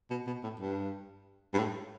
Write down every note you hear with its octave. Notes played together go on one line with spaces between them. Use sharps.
B2
B2
A2
G2
G2
A2